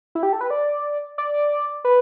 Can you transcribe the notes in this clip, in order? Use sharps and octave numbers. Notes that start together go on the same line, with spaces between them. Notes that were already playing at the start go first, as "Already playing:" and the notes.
E4
G4
A4
B4
D5
D5
B4